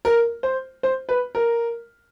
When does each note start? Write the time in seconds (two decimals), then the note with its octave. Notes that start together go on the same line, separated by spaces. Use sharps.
0.05 A#4
0.43 C5
0.83 C5
1.09 B4
1.35 A#4